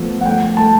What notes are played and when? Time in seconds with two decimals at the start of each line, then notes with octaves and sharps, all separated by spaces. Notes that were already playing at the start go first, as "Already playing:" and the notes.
Already playing: F3 A3 B3
0.21 F#5
0.25 A3 G5
0.57 A3 A5